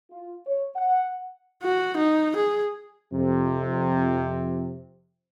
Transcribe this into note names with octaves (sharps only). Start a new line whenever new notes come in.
F4
C#5
F#5
F#4
D#4
G#4
F2 C3